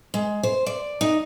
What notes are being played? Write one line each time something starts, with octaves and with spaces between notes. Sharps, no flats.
G#3
C5
D5
D#4